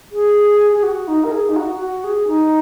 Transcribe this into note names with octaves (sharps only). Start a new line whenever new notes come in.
G#4
G#4
F#4
D#4
A#4
G#4
D#4
F#4
F#4
G#4
D#4